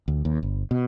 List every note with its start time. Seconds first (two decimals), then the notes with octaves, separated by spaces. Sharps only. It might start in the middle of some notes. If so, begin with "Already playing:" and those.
0.08 D2
0.25 D#2
0.43 G1
0.71 B2